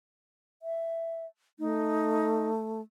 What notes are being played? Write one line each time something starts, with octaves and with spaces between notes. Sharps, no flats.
E5
A3 D#4